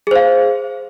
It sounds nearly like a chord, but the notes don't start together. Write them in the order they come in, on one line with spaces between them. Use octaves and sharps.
G#4 C5 F5